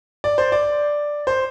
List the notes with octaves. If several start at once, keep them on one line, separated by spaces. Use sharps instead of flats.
D5
C5
D5
C5